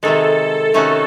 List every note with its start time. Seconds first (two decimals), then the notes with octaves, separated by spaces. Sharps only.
0.03 C3 D#3 G#3 A4
0.73 C3 D#3 A3 C#4 F#4